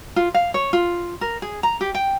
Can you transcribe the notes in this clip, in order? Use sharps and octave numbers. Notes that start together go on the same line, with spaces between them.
F4
F5
C#5
F4
A#4
G#4
A#5
G4
G5